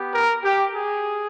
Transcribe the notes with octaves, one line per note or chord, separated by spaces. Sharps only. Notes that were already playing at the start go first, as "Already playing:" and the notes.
Already playing: B3 G4
A#4
G4
G#4